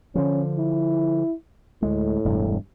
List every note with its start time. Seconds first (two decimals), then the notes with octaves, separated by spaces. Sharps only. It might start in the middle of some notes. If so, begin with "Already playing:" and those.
0.15 D3 F3 C#4
0.58 E4
1.82 D2 A2 G#3
2.25 E1 G2